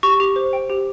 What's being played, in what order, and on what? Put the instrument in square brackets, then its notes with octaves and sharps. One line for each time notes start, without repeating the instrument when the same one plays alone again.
[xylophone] G4 C#6
G4
C5
G5
G4